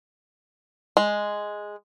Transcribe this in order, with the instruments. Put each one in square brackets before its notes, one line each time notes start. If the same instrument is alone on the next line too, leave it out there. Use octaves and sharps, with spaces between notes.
[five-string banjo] G#3